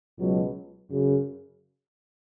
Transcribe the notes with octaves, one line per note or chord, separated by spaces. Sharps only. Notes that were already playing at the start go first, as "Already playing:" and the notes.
C#2 B2 F#3
F#2 C#3